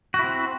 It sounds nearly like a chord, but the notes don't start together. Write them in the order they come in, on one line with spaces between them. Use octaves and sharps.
F#4 E4 C4